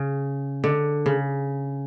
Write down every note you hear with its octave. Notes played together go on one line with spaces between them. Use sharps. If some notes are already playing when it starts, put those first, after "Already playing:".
Already playing: C#3
D3
C#3